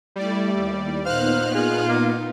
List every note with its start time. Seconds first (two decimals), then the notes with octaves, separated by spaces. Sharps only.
0.16 G3 A3 E4 D5
0.54 D#2
1.05 A#2 B3 D#4 C5 F5 F6 F#6
1.55 F4 G#4
1.89 A#3